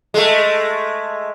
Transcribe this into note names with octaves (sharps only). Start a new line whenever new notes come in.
G#3 A3